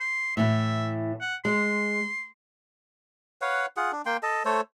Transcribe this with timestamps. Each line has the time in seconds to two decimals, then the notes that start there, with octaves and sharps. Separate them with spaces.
0.01 C6
0.37 A2 E3 E5
1.21 F#5
1.45 G#3 C6
3.42 B4 C#5 F5 F#5
3.77 F4 G#4 F#5
3.92 D4
4.06 A#3 G5 C6
4.23 A4 D#5 A5
4.45 A3 A4 C5 C#5